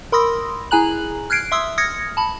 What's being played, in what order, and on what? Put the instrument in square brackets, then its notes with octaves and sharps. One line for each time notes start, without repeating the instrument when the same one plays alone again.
[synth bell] A#4 B5 C6 D#6 E6 A#6
E4 G#4 G#5 A#5 F#6 F#7
F6 F#6 G#6 C7 D7
E5 C6 D#6 E6
D#6 F6 G#6 A#6 C#7
A5 B5